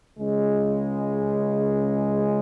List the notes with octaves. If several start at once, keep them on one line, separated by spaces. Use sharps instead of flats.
C#2 C#3 G#3